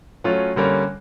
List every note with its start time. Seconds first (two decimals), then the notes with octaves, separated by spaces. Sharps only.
0.24 F#3 A3 C#4 F4
0.56 D3 G3 A#3 C#4